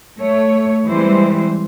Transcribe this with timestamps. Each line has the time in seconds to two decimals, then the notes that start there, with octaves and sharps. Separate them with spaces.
0.18 A3 C#5
0.88 E3 G3 G#3 C4 C5